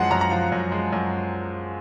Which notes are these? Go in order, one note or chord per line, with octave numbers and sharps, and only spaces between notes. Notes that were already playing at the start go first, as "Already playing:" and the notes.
Already playing: F#2 F3 G#3 F#5
F#2 A#5
A#5
F3
F#2
G#3
F#2